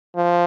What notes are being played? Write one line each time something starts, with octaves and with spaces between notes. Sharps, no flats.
F3